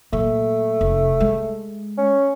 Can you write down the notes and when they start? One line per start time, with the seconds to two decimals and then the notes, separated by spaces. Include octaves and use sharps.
0.13 A#2 F#3 A3
0.81 F1
1.20 G#3
1.98 C#4